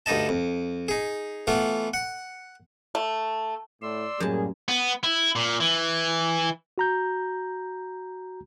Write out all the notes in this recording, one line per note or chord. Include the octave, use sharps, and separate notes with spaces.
D2 G2 D#4 D#5 A5
F2
D#4 G#4
E3 A3 B3 F4
F#5
A3
A2 D5 C6 E6
F#2 A2 G3 A#3 C#4 G#4 A5
B3
E4
A#2
E3
F#4 A#5 G6